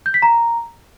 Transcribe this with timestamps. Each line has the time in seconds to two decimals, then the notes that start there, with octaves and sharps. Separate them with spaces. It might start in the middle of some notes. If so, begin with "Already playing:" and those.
0.06 G6
0.14 B6
0.22 A#5